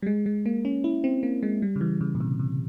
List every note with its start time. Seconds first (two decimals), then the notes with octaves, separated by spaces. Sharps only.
0.02 G3
0.06 G#3
0.26 G#3
0.46 A#3
0.65 C#4
0.84 E4
1.04 C4
1.23 A#3
1.43 G#3
1.62 G3
1.76 C#3
1.81 E3
2.01 C#3
2.15 A#2
2.20 C3
2.39 C3